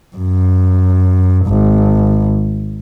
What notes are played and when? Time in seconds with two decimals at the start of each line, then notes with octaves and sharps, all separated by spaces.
0.16 F#2
1.47 G#1